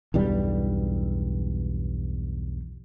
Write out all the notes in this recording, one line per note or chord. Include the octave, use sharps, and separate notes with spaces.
B1 E2 G2 G3